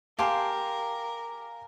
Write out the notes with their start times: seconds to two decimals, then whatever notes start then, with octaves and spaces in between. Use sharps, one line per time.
0.19 G4 A#4 F5 G#5 A5 C6